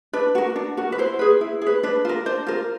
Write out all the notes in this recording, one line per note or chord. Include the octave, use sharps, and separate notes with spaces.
D4 B4
F#4 A#4
D4
F#4 A#4
B4
E4 C5
G#4 B4
E4
G#4
B4
D4 B4
F4 A#4
D4 C5
F4 A#4